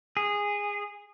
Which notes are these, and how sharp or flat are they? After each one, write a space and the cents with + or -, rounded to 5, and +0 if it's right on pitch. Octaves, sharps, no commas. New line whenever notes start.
G#4 -15